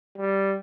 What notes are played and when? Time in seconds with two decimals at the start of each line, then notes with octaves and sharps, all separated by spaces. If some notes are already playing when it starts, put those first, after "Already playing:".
0.18 G3